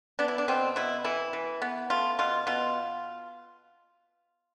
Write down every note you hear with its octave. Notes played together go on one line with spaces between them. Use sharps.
B3 D4
E4
D4
B2 C4
B2 E4
E3 E4
E3
B3
A3 F4
B2 F4
B2 F4